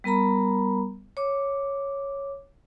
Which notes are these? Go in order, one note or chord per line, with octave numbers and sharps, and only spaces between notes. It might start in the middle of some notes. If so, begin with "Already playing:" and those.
G3 B3 A#4 A#5 B5
C#5 D6